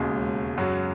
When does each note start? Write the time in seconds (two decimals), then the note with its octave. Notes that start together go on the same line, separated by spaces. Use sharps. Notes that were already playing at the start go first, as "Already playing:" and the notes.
Already playing: E1 D#2 C#3 G#3
0.58 F#2 C#3 F#3